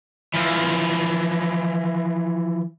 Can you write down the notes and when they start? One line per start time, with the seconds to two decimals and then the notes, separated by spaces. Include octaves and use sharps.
0.34 E3 F3